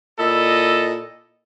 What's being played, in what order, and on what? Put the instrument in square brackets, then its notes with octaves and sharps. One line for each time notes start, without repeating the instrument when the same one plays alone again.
[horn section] A#2 E4 A4 D#5